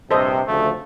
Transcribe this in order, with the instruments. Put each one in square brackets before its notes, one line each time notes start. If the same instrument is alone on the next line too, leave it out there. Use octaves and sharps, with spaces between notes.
[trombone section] A#1 G2 C3 [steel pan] A4 C5 D#5
[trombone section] D2 C#3 F3 [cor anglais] A3